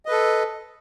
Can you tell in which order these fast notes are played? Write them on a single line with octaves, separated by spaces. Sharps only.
D#5 B4 A4